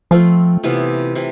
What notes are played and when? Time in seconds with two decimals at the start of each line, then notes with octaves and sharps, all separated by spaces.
0.11 F3 A3 C4 F4
0.64 C3 E3 B3 F4
1.15 C3 E3